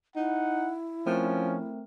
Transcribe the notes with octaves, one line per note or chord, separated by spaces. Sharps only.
D#4 E4 F#5
F3 A3 C4 C#4 A#4